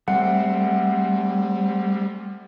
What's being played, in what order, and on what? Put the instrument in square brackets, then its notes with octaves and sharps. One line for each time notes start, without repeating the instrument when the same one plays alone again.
[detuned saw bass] G3 [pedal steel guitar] A3 C4 [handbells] F#5